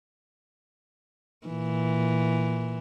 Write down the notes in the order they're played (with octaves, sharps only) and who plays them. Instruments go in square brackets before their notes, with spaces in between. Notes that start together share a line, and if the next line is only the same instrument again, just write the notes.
[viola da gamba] A#2 E3